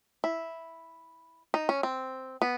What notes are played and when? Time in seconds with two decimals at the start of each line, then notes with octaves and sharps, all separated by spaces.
0.24 E4
1.54 D#4
1.69 C#4
1.83 C4
2.42 B3